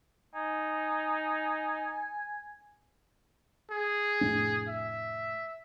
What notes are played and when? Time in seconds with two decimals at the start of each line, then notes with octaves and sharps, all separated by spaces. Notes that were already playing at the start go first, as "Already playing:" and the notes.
0.35 D#4 G#5
3.71 G#4
4.21 F1 A2 D4
4.68 E5